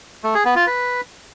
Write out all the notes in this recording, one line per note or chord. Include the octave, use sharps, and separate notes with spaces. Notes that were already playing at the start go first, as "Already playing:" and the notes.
A3
G#4
B3
F4
B4